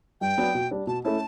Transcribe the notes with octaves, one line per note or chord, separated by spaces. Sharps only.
G2 G5
F#3 B3 D4
B2
G3 D4
B2 A5
A3 C#4 E4 A5